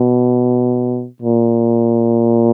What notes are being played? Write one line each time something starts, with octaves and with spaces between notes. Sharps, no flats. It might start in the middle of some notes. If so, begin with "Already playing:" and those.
Already playing: B2
A#2